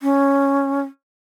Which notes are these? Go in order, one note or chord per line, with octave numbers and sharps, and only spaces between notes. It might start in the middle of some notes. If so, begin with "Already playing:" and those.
C#4